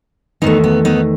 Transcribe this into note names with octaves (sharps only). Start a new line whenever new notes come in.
E2 D#3 A3 B3 D#4
B3
B3 D#4